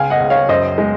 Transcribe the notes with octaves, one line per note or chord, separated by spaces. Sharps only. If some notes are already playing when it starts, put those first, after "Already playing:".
Already playing: C#2 F5 G#5
D#5 F#5
C#2
C#5 F5
F#2 C5 D#5
G#3